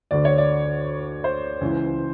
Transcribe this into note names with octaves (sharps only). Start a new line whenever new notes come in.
D2 D3 D5
C#5
D5
C5
C#2 C#3 E3